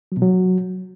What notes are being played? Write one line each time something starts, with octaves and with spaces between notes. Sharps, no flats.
F#3
B2
F#3